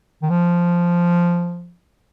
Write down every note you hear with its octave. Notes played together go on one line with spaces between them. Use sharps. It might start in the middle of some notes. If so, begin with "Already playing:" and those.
D#3
F3